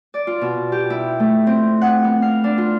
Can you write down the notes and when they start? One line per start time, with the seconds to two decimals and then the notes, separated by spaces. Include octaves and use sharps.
0.14 D5
0.27 F4
0.41 B2
0.72 G4
0.90 E4
1.20 A3
1.47 C4
1.81 F#5
2.04 B3
2.22 F5
2.44 D4
2.58 F4